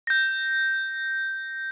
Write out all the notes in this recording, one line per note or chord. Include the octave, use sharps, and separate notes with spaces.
G6 A#6